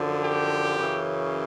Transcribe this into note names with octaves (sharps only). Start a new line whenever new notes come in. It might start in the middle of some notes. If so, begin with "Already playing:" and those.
Already playing: F#2 D3 F3
G4
F#2 C#3 E3